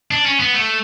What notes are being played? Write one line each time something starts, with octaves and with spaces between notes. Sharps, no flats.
D4
C#4
B3
A3